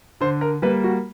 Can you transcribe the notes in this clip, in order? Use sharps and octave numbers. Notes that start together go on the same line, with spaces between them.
D3 C5
A#4
G3 A#3 B4
F#4